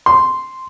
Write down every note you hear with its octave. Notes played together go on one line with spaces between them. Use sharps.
C6